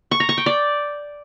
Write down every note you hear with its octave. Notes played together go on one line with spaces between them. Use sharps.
C#6
A#5
C#6
G5
D5